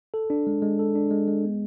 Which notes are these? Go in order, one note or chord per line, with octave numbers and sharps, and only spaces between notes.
A4
D4
G#3
G#3
A4
D4
G#3
G#3
B3